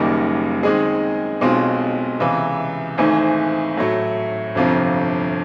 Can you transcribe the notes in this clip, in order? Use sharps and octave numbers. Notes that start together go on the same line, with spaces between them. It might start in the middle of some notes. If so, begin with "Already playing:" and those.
Already playing: F#1 F#2 D#3 G3 A#3
D#3 G#3 C4 D#4 G#4
B1 B2 G#3 C4 F4
C#2 C3 E3
G#1 G#2 E3 A3
A2 F#3 A3
G1 F2 C3 F3